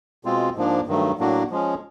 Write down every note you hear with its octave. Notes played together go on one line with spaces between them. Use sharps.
B2 G#3 C4 F4
G#2 F3 A#3 D4
G2 D#3 F#3 A3
A2 F#3 A#3 D4 F#4
F3 G#3 C#4